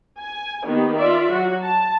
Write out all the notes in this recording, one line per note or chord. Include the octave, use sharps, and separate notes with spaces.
G#5
D#3 A#3 B3 G4
F4 D5 E5
F#3 F#4
A5